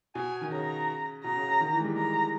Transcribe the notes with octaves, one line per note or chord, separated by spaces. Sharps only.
B2 G#5
D#3
C#3 A#5
B2 A#5
C#3
C#3
D#3
E3
G#3
G3
G#3 A#5